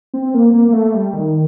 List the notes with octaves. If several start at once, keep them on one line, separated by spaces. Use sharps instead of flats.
C4
A#3
A#3
A#3
A3
G3
D#3